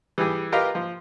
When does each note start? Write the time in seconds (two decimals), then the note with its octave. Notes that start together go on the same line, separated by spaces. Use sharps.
0.18 E3 G3 G4 G#4
0.52 F4 G4 A#4 B4 D#5 F5
0.75 F3